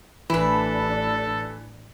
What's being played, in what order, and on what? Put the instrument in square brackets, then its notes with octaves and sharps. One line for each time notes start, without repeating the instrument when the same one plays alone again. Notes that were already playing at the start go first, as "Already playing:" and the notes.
[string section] A1 D4 [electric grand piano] E3 [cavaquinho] E4 B4 [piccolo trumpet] A4